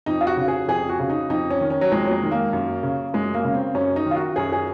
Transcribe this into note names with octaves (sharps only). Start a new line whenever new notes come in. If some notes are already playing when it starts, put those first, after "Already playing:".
F2 D#4
F4
F#4
C#3
G#4
F2 G#4
F#4
C#3
D#4
F2 D#4
C#4
D#3
C#4
F#3
F2 G#3
F#3
G#3
D#3
A#3
F#2
C#3
F#2 G#3
A#3
C#3
C4
F#2 C#4
D#4
D#3
F4
F#4
F#2 G#4
G#4